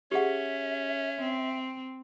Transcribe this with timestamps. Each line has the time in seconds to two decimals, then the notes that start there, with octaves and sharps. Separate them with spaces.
0.12 C#4 G4 G#4 E5 F#5
1.19 C4